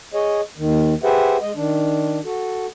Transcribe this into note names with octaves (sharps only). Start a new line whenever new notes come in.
G#4 C#5 D#5
D#2 D#3
G4 G#4 B4 C5 E5 F#5
G#3 D#5
D#3 D4
F#4 A4